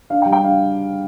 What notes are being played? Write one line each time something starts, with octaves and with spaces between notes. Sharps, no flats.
D4 F5
G5
G3
G5
D4 F5